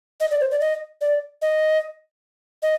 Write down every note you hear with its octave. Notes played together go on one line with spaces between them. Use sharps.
D#5
D5
C5
D5
D#5
D5
D#5
D#5